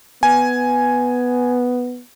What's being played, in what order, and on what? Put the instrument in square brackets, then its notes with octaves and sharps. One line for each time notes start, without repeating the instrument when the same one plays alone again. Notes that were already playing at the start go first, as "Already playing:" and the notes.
[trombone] B3 [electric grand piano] G#5